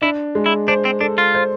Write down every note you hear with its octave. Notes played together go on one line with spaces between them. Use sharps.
D4 E4
G#3
E4
D4 C5
C4
D4 A4
F4
C5